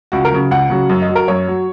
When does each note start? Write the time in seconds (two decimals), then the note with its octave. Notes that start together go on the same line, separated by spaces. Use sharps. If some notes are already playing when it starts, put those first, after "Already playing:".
0.12 C#2 F#4
0.25 A#4
0.32 C#3 F#3
0.51 C#2 F#5
0.70 C#3 F#3
0.89 F#2
1.02 D#5
1.09 F#3
1.15 A#4
1.28 F#2 C#5
1.48 F#3